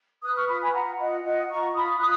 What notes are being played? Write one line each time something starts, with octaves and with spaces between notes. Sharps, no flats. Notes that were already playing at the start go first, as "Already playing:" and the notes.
B4 D#6 F#6
C#6 F6
F4 B5 D#6
G#5 B5
F4 F#5 A#5
F4 D#5 F#5
F4 D#5 F#5
F4 A#5 C#6
F4 B5 D#6
F4 D#6 F#6